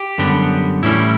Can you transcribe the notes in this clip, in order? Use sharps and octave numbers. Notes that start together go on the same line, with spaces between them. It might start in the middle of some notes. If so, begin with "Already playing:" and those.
Already playing: G4
F#2 D3 G3 B3
A2 E3 G3 C#4 E4